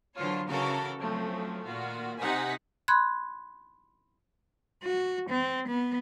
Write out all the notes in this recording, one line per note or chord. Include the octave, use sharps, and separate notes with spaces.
D3 E3 F#3 F4 C5 C#5
C#3 E3 F#4 A4 A#4
F3 F#3 A3 C4 C#4
A#2 D#3 F4 F#4
C3 D#4 C5 F#5 G#5 B6
B5 C6 F#6 G#6
F#4
C4
B3